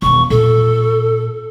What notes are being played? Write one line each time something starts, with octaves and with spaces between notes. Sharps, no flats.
E1 D#3 C#6
A#2 A4